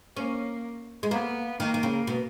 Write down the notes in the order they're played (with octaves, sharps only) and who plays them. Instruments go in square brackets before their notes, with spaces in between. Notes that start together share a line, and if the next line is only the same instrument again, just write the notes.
[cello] A#3 [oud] C#4
[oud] G#3
[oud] A#3 [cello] B3
[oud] D#3 [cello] A#3
[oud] D#3
C#3
B2